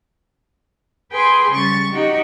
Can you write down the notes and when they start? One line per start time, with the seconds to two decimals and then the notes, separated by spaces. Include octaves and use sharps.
1.13 G#4 B4 G5 G#5 C6
1.52 C#3 G3 C#6 A6
1.93 D#4 F#4 G4